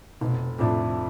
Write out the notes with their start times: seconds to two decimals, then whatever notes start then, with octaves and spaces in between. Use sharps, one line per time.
0.21 F1 B2
0.58 F2 A2 F3 A3 D4